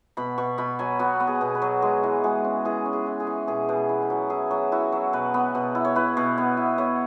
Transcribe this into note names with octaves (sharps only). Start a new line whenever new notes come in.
B2 B5
B2 C#6
B2 B5
F#3 G#5
B3 F#4
B3
G#4
B2
B4
F#3
G#3 G#4
E3
G#3 F#4
C#4
E3 G#4
C#4
G#4
E4
G#4
E3
B2 G#4
B2
B4
E4
B4
F#3
E4 G#4
F#3
E4 F#4
F#3
B2 B4
B3
B2
E4
C#5
E4 B4
B2
B3
E4
B3 C#5